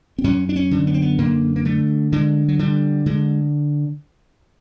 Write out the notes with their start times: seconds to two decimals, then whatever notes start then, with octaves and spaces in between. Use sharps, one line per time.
0.18 C4
0.24 F#2 C#4
0.49 D4
0.56 C#4
0.71 D3
0.87 B3
0.94 C4
1.02 B3
1.18 F#2 A#3
1.56 A#3
1.65 D3 A3
2.12 D3 G#3
2.48 F#3
2.59 D3 G3
3.06 D3 G#3